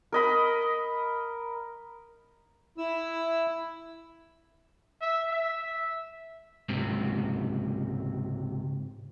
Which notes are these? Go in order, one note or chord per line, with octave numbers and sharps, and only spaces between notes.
A#4 D#5 B5
E4 E6
E5
E5
C#2 G#2 C3